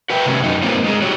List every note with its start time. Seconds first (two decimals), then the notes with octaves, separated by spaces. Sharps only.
0.10 F#4 B4 E5 G5
0.26 C3 D#3 G3 A3 C#4
0.44 F#2 D#4
0.63 G3 A#3 C4 F4
0.84 G#3 D#4 G#4
1.02 F#4 G4 C#5